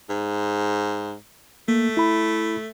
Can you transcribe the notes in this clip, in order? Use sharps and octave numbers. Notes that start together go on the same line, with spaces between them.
G#2
A3 A#3
E4 B5